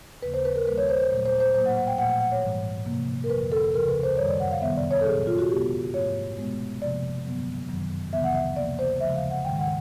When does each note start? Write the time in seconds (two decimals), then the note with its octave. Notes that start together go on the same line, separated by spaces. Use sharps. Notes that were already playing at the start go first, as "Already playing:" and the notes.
0.22 D#2 C#3 F3 A#3 B4
0.34 C5
0.45 B4
0.56 A#4
0.67 D#2 D#3 G3 A#3 B4
0.78 C#5
0.89 C5
1.00 C5
1.10 A#2 F#3 A3 C5
1.26 C5
1.40 C5
1.54 A2 F#3 A#3 C5
1.66 F#5
1.77 F#5
1.87 G5
1.98 A#2 F3 A3 F#5
2.10 F#5
2.20 F#5
2.32 C#5
2.42 G#2 E3 G3
2.86 C3 F3 A#3
3.24 A#4
3.30 F2 D3 F3 B4
3.52 A4
3.63 A4
3.74 D2 C#3 F3 A#4
3.89 B4
4.03 C5
4.17 F#2 D#3 G3 C#5
4.28 D5
4.40 F#5
4.51 F5
4.62 F2 C3 D#3 G3 B3 E5
4.77 D5
4.91 C#5
5.01 A4
5.06 A#2 F#3 B3 G#4
5.27 F4
5.38 F#4
5.50 C3 D#3 G#3 B3 G4
5.93 G#2 F3 A3 C#5
6.38 B2 G#3 B3
6.81 F2 C3 F3 A#3 D5
7.25 G2 D3 F#3 B3
7.69 F#2 D#3 F#3
8.13 D2 C#3 E3 G3 B3 E5
8.24 F#5
8.34 E5
8.56 C3 F3 A#3 D5
8.79 C5
9.00 D#2 C#3 F3 G#3 E5
9.16 F5
9.30 F#5
9.45 G#2 D#3 G#3 G5
9.59 F#5